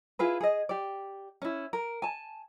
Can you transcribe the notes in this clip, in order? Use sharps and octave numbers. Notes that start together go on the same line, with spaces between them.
E4 F4 G#4 B4
G#4 D#5
G4 D5
C#4 E4
A#4
G#5 A5